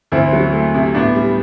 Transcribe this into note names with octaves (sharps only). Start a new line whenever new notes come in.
D2 C4 E4
F#3
A3
C3
A2 B3 D4
G3